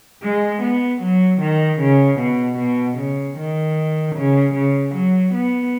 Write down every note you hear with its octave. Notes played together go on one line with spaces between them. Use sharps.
G#3
B3
F#3
D#3
C#3
B2
B2
C#3
D#3
C#3
C#3
F#3
B3